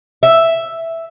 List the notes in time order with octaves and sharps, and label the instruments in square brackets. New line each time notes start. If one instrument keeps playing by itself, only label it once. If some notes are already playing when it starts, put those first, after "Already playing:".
[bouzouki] E5